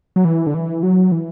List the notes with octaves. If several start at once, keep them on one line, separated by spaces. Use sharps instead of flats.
F#3
E3
D3
E3
F#3
E3